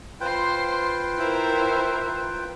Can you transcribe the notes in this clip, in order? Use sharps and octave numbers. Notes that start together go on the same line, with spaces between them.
F4 B4 C5 G5 C6
E4 A#4 C5